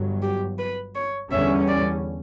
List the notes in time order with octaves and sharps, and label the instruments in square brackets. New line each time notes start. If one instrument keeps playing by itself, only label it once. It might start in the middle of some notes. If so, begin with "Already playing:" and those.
Already playing: [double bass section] G1 G2 F#3
[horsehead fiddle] G4
B4
C#5
[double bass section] E2 D3 G3 C#4 [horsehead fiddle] E5
[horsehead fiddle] D5